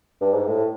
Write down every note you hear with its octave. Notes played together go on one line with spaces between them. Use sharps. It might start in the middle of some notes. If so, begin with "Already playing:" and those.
G2
G#2
A2